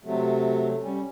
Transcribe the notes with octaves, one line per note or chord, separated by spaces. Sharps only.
C3 F#3 A3
G3 C#4